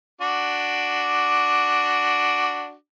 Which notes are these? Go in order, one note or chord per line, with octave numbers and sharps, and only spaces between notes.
D4 F#4 D6